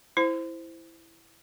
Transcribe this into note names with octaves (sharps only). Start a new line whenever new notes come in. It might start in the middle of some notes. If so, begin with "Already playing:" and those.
E4 C5